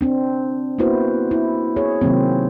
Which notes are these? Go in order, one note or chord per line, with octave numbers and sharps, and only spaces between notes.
C4 D4
A#3 B3 E4 F#4 B4 C5
E4
G#4 C#5
C3 D#3 F#3 A#3 C4